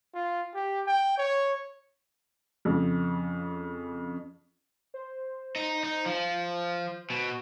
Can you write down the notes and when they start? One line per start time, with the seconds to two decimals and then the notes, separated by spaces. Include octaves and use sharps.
0.14 F4
0.54 G4
0.86 G5
1.17 C#5
2.65 F2 C#3
4.94 C5
5.56 D#4
5.84 D#4
6.06 F3
7.10 B2